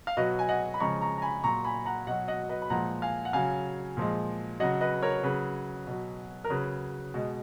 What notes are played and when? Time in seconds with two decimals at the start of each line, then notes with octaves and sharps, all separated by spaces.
0.07 F5
0.17 B2 F#3 B4 D#5
0.39 G#5
0.49 D#5 F#5
0.74 B5
0.80 C#3 F3 G#3 A#5 C#6
1.01 A#5 C#6
1.18 A#5
1.22 G#5 B5
1.44 A#2 F#3 A#5 C#6
1.64 G#5 B5
1.86 F#5 A#5
2.07 B2 F#3 D#5 F#5
2.28 D#5 F#5
2.49 B4 D#5
2.62 B5
2.70 A#2 F3 G#3 F#5 A#5
3.02 F5 G#5
3.25 F#5
3.33 C#3 F#3 F5 G#5
3.97 A#2 F3 G#3
4.60 C#3 F#3 D#5 F#5
4.81 B4 D#5
5.02 A#4 C#5
5.23 C#3 F#3 G#4 B4
5.87 B2 F#3
6.44 A#4
6.50 C#3 F#3 G#4 B4
7.14 B2 G#3